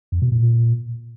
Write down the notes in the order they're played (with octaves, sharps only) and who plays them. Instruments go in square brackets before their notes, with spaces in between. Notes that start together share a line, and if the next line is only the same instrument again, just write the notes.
[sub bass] F2
B2
A#2